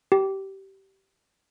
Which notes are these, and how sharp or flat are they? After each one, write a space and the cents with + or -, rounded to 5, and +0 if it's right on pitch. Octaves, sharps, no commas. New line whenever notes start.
G4 -20